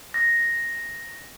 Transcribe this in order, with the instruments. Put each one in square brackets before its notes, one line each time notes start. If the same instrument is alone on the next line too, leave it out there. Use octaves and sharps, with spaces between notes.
[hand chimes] A#6